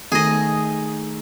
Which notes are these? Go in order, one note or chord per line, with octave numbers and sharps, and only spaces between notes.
D#3 A3 G#4 D#5